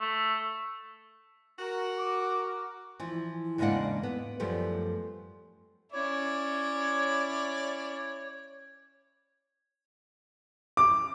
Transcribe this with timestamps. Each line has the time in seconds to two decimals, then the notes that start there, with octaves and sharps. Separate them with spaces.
0.01 A3
1.59 F#4 A#4
1.98 D6
3.00 E3 F3
3.58 E2 G#2 C#3 A#3 D4 F#5
4.03 B3
4.40 F#2 F3 G3 A3 B3
5.92 C#4 E4 C#5 D5
10.77 D6